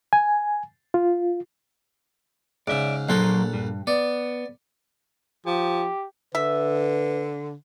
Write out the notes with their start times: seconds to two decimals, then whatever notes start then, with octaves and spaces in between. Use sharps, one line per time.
0.13 G#5
0.94 F4
2.67 G#2 C#3 D5 E5
3.09 A#1 F#3 A#3 A4 C5 F#5
3.53 G2
3.87 B3 D5
5.46 F3 G4
6.35 D3 B4 E5